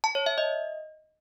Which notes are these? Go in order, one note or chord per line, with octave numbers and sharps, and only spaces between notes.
A5
C#5
E5
D#5